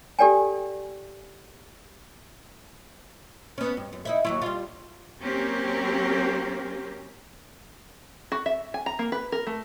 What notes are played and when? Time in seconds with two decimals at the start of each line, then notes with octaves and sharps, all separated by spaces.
0.19 G4 A4 D5 G5 G#5
3.58 B3 C#4
3.77 G2
3.93 F#2
4.05 D#4 E4 E5
4.25 D#2 F#3 E4
4.42 G3 F4
5.21 F#3 A#3 C4 C#4 G4 A#4
8.32 F#4
8.46 E5
8.74 G#5
8.86 A#5
8.99 A#3
9.12 B4
9.32 A#4
9.47 A3